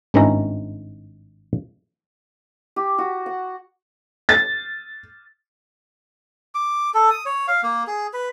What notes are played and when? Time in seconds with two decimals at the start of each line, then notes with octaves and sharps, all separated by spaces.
0.14 G#1 G2 D#3 C#4 E4 A#5
2.76 G4
2.98 F#4
3.26 F#5
4.29 A6
6.55 D6
6.94 A4
7.10 D#6
7.26 C#5
7.48 F5
7.63 A#3
7.87 G#4
8.13 B4